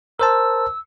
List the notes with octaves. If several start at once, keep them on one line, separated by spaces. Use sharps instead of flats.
A#4 C5 A5 E6